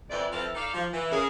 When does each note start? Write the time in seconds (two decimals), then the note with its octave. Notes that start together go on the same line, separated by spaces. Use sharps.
0.10 F2 E3 D5
0.32 F3 C4 E4 A4 B4 F5
0.55 D#4 A4 D5 F5
0.74 F3
0.93 E3
1.11 C#3 G#4 A#4